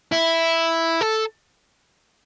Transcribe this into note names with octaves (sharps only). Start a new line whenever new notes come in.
E4
A4